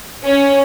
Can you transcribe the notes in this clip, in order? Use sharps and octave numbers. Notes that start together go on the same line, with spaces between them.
C#4